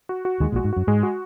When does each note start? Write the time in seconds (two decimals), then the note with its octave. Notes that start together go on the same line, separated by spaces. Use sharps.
0.09 F#4
0.25 F#4
0.40 D#2 D#3 G#3
0.52 A#1 A#2
0.56 F#4
0.64 G#2
0.73 F#2 F#4
0.87 G#2 G#3
1.03 F#4